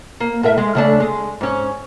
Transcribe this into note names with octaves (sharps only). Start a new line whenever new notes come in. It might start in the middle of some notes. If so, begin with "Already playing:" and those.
A#3
A2 A#4 E5
G#3
C#3 A3 D4
G#3
G#2 C#4